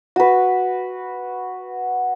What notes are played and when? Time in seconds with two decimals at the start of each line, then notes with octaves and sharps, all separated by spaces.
0.16 F#4 B4